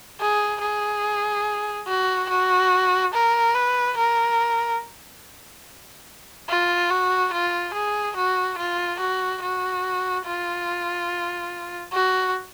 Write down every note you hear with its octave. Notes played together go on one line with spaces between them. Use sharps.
G#4
G#4
F#4
F#4
A#4
B4
A#4
F4
F#4
F4
G#4
F#4
F4
F#4
F#4
F4
F#4